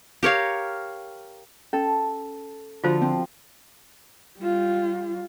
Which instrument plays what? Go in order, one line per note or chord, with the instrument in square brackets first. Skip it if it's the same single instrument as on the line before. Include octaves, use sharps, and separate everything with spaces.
[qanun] G4 A#4 C#5 F5
[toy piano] C#4 [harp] A4
[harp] D3 F3 [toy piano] F4 F#4 C5
[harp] C4
[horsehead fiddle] G3 F4